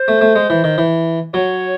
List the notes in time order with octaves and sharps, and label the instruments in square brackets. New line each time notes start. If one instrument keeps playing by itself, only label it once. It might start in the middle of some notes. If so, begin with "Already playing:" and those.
Already playing: [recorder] C5
[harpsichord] A3
A3
G#3
E3
D#3
E3
[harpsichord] F#3 [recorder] C#5